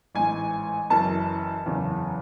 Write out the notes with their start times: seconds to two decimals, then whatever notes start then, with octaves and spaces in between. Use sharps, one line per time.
0.15 A1 G#2 E3 G#5
0.90 F#1 F#2 E3 A5
1.65 F#1 E2 C#3 E3